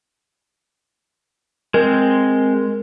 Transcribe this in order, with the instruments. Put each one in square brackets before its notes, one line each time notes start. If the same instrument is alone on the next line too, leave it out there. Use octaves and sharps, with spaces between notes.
[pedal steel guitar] G#3 C4 [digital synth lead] A#4